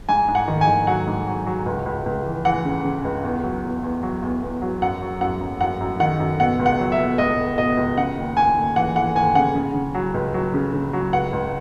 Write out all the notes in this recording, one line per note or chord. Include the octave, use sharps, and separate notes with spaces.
G#2 G#5
G#2
F#5
D#3
G#5
D#3
F#3 F#5
G#2
F#3
F#3
C#2
C#2
C#2
E3
E3 F#5
C#3
C#3
C#2
E2
F#3
E2
E2
F#3
E2
E2
F#3
F#2 F#5
F#3
F#2 F#5
F#2
F#2 F#5
F#2
D#3 F#5
F#2
B2 F#5
C#2
F#5
F#3
E5
B2
C#2 D#5
C#2
B2 D#5
C#2
C#3 F#5
D#2
D#2 G#5
D#2
E3 F#5
E3 F#5
D#2 G#5
C#3 F#5
C#3
C#3
F#3
C#2
F#3
C#3
C#3
F#3
C#2 F#5
C#2